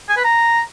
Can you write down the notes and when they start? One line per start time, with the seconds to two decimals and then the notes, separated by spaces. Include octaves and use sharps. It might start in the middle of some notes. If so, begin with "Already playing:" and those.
0.09 G#5
0.17 B4
0.24 A#5